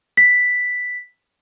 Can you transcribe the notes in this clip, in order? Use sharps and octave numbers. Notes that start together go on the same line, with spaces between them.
B6